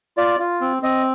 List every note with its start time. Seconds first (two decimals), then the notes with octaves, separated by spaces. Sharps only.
0.17 F4 D5
0.39 F4
0.61 C4
0.82 C4 D#5